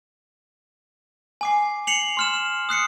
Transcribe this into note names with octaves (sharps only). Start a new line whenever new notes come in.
G#5 D6 C7
C7 C#7 F7 F#7
C6 F6 E7
D#6 F#6 C7 C#7